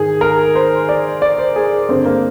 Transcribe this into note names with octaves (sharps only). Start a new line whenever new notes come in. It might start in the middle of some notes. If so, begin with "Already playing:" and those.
Already playing: G#2 D#3 G#4
A#4
C5
D5
D5
C5
G#4
G2 D3 C4
A#3